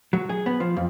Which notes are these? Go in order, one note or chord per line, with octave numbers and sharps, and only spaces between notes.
F#3
G#4
B3
F3
F2